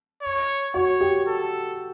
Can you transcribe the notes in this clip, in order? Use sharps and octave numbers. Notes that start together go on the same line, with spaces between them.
C#5
F#4 C#5
G4
A4